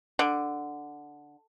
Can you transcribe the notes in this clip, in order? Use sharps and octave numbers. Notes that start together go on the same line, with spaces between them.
D3